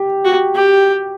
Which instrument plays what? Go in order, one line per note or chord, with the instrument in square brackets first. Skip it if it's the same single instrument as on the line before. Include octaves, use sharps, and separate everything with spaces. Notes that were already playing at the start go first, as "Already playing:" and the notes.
Already playing: [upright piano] G4
[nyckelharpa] F#4
G4